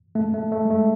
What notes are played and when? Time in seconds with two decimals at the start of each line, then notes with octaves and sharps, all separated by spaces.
0.15 A3
0.34 A3
0.52 A3
0.65 G#3
0.70 A3